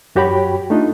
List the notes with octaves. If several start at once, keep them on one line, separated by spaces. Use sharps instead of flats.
F#2 F#4 G4 C#5 G5 B5
A3 D4 D#4 F4